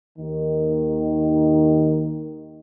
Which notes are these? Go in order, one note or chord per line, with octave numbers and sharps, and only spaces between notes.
D#2 D#3